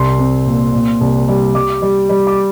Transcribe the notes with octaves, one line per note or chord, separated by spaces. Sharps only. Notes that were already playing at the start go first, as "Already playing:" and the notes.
Already playing: C2 C6
C4
A#2
A#2
C2
G3
G3 D6
G3
G3
D6